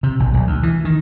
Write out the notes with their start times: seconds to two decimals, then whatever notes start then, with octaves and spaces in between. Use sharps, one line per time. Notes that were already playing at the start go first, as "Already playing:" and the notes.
0.03 C3
0.20 A#1
0.34 B1
0.47 D2
0.63 E3
0.85 D#3